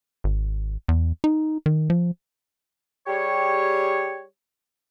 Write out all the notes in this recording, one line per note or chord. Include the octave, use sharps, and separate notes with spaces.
G#1
E2
D#4
D#3
F3
G3 G4 G#4 C#5